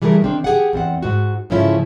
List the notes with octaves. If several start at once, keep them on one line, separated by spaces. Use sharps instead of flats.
E3 G3 A3 G#4 A#4
D#3 C4 D4
G4 G#4 F#5
E2 C4 F#5
G#2 F#4
G#2 C#3 F3 A3 C#4 E4